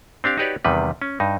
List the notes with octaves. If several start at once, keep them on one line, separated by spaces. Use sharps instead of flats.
C4 D4 G4 F5
D#4 F#4 G4 B4 C#5 D5
E2 C3 D#3 G3 B4
C#4
G2 D#4